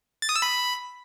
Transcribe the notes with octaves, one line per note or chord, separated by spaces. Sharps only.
A6
D#6
E6
B5